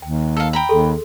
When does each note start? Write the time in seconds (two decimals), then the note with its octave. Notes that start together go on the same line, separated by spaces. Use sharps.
0.02 D#2 G5
0.37 A4 F5 E6
0.53 G5 A#5 B5
0.69 D#2 G#4 A4 C6